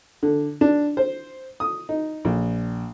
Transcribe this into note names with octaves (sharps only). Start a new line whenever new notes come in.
D3
D4
C5
D#6
D#4
A#1